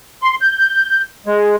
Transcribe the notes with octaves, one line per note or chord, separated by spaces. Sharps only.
C6
G6
G#3